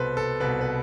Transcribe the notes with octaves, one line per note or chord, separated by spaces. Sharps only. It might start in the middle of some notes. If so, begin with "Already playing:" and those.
Already playing: C2 B2 A4 B4 C5
A4
C2 B2 B4
B4